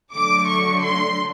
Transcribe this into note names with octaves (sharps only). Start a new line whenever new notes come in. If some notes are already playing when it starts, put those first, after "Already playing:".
D3 F#3 A3 D6
C#6
C6